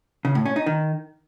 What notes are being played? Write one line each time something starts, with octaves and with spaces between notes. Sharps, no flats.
C#3
A2
C#4
D#4
D#3